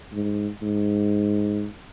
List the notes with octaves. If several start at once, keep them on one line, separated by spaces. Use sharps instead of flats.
G#2
G#2